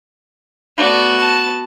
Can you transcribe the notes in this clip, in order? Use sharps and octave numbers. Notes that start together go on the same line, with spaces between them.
A3 B3 F#4 D5
A5